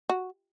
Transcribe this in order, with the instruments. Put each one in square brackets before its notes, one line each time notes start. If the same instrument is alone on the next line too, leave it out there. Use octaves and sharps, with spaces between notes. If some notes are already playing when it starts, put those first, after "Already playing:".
[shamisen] F#4